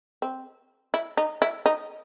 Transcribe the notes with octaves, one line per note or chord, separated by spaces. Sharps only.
C4
E4
D#4
E4
D#4